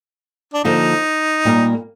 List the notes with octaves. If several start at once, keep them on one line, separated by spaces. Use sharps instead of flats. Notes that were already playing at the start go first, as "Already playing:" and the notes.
D4
D3 F3 A#3 D#4 F4
A#2 G3 A#3 F4 A#4